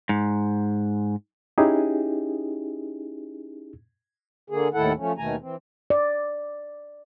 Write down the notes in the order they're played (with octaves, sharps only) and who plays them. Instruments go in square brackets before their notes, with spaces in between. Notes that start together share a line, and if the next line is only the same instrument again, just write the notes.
[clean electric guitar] G#2
[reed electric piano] C#4 D#4 E4 G4 G#4
[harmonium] D3 A#3 G#4
D#2 A2 D#3 E4 A4 F#5
F3 A3 C#4
D#2 B2 D#3 A3 G#5 A#5
E3 C4
[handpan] D5